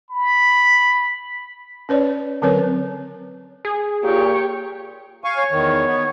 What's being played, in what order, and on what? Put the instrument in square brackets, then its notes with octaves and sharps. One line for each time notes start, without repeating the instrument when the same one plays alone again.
[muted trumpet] B5
[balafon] C#4 B4 C#5 D5
D3 F#3 C4 A#4 B4 C#5
[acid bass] G#4
[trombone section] A#2 [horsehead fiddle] G4 C#5
[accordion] F5 G#5 C#6
[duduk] C#5
[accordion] E2 D#3
B3